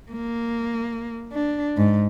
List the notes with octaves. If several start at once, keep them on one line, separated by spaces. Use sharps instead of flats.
A#3
D4
G#2